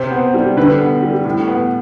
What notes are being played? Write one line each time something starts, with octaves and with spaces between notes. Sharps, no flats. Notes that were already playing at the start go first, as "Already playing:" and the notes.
Already playing: C3 C5
B3
G3
D3 B4
B3
G3
A2
B3